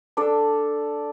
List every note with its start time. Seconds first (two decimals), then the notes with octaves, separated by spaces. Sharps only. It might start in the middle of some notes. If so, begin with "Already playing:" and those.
0.17 D4 A4 D5